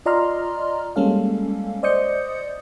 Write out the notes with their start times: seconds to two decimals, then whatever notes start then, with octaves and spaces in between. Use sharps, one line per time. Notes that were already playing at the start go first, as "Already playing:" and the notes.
0.06 F4 D5 D#5 A#5 C6 F6
0.96 G3 G#3 A#3 C#4 A4 F5
1.83 C5 D5 D#5 D#6 G6 C#7